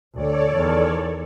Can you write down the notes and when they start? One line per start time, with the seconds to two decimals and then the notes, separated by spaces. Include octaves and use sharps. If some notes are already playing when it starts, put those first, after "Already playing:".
0.15 D2 A4 C#5 D5
0.52 E2 D#3